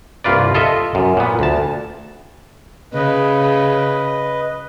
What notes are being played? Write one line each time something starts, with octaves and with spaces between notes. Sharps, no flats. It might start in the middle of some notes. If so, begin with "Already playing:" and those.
C2 G2 A#3 F4 B4 D5
F4 A4 D#5 E5
F#2
A#2 B3
D2 A5
C#3 B4 D#5